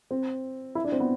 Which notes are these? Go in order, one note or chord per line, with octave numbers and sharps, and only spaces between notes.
C4
E4
D4
C4
B3